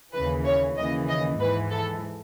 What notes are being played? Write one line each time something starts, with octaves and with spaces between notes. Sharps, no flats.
D#2 C#3 E3 B4
C#5
D#2 C#3 E3 D#5
D#5
G#2 E3 B4
A4